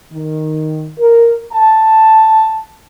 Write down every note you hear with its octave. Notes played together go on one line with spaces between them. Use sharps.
D#3
A#4
A5